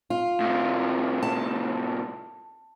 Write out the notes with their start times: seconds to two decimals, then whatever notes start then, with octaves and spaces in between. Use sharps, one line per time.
0.10 F4
0.40 A2 C3
1.23 A5